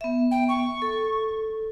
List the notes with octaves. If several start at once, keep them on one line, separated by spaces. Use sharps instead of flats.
B3 E5
G5
C#6
A4